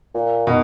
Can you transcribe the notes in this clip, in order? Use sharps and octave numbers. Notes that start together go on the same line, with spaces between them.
A#2
B2 D#3